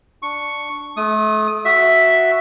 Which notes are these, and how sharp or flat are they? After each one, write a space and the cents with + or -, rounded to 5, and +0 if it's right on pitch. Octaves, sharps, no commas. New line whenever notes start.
D4 +0 C#6 +0
A3 -35 D#6 +0
F#4 +0 E5 +0